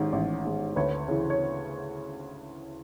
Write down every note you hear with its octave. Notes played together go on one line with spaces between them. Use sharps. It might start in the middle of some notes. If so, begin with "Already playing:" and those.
Already playing: A1 G#2 D#3
A1
G#2 D#3
D2 B4 C#5
C#3 E3
C#5